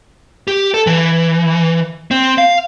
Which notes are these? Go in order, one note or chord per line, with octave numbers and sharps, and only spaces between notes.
G4
A4
E3
C4
F5